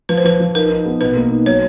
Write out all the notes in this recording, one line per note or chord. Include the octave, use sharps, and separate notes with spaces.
F3 B4
C5
F3 B4
F3
D#4 A#4
D#4
B3
B2 B4
A#3
D#4
F#3 C#5